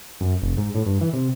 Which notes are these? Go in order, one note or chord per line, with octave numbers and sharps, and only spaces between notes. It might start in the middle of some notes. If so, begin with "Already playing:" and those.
F#2
F1
G#2
A2
G2
E3
C3